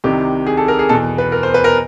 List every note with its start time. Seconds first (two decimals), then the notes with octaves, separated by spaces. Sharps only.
0.04 C2 C3 D#3 G4
0.47 G#4
0.57 A4
0.68 A#4
0.79 G#4
0.89 E2 B2 A4
1.18 B4
1.32 A#4
1.43 C5
1.54 B4
1.64 A#4